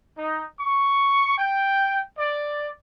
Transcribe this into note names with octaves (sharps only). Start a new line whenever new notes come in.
D#4
C#6
G5
D5